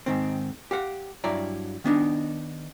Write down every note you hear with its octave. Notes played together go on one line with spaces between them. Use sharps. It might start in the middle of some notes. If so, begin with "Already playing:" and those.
G#2 D#3 C4
G4 F5 F#5
G2 F#3 E4 D5 A#5
D#3 B3 D4 D#4